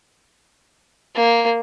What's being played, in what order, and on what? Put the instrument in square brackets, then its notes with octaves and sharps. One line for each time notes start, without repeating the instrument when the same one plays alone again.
[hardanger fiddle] A#3